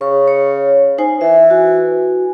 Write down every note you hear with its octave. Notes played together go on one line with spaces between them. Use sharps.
C#3 C#6
C#5
D#4 C5 G#5
E3 E5
F#4 G#5